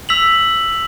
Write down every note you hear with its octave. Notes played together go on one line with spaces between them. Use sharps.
E6 B6 F7 F#7